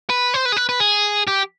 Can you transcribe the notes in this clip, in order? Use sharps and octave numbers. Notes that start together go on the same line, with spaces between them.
B4
C5
B4
G#4
B4
B4
G#4
G4